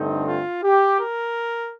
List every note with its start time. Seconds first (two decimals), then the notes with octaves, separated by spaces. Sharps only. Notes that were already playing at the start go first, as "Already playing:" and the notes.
Already playing: G2 D3 A3 C4 D#4
0.27 F4
0.63 G4
0.99 A#4